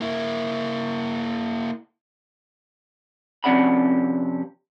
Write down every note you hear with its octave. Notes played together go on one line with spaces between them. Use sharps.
A#3 E4
F2 C3 C#4 D5 F#5 B5